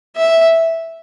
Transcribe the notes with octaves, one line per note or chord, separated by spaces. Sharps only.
E5